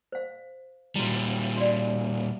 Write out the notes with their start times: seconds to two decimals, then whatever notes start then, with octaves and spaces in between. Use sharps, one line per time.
0.12 C5 F5
0.96 A#2 G3 E4 F#4
1.56 F#4 D5